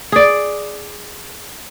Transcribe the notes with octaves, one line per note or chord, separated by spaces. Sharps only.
G#4 D5